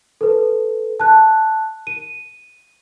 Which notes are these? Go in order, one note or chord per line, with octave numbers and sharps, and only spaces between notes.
A4 B4
A5 F#6
D#7